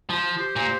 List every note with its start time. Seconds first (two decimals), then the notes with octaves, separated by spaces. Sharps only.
0.10 F3
0.37 G4 C5
0.56 A#2